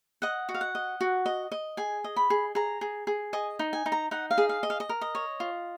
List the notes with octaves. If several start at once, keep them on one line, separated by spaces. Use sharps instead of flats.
D#5 F#5
F#4
F5
F#5
D#5
F#4
D#5
D#5
G#4 G#5
D#5
B5
G#4
G#4 A#5
G#4
G#4
D#5 G#5
D#4
G#5
D#4
A#5
D#4 F#5
F5
G#4
F5
D#5
F5
D#5
A#4
D#5
C#5
F4